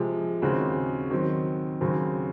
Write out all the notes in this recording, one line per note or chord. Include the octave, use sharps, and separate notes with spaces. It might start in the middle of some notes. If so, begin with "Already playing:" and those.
Already playing: C3 F3 G#3
D#2 C#3 G#3 C4 F#4
D#3 F#3 C4
D#2 C#3 F#3 C4